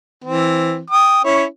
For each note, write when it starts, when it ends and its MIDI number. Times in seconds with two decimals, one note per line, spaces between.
0.24 0.79 52
0.24 0.79 60
0.90 1.22 79
0.90 1.22 87
1.24 1.44 61
1.24 1.44 64
1.24 1.44 73